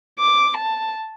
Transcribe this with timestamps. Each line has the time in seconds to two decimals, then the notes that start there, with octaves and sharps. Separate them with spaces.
0.19 D6
0.57 A5